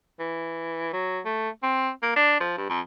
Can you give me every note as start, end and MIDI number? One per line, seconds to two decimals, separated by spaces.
0.19 0.91 52
0.93 1.20 54
1.25 1.49 57
1.63 1.90 60
2.03 2.15 58
2.16 2.38 62
2.40 2.55 53
2.57 2.67 43
2.70 2.80 41